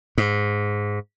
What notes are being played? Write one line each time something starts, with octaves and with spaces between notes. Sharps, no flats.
G#2